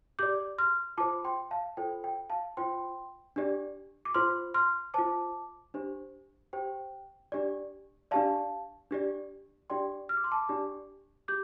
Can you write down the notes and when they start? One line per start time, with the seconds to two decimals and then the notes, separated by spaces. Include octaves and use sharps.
0.19 G4 D5 D6 G6
0.58 C6 F6
0.98 F4 C5 A5 D6
1.24 G5 C6
1.51 F5 A5
1.77 F4 A4 C5 G5
2.04 G5
2.30 F5 A5
2.57 F4 C5 G5 C6
3.36 D4 G4 D5
4.05 D6
4.14 F4 C5 C6 F6
4.54 C6 F6
4.94 F4 C5 A5 D6
5.74 D4 G4 C5
6.53 G4 C5 G5
7.32 D4 G4 D5
8.11 D4 G4 D5 F5 A5
8.91 D4 G4 D5
9.70 D4 G4 D5 G5 C6
10.09 F6
10.17 D6
10.24 C6
10.31 A5 D6
10.49 D4 G4 D5
11.28 G4 D6 G6